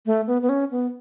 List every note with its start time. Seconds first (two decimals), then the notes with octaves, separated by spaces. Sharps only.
0.06 A3
0.27 B3
0.42 B3
0.49 C#4
0.71 B3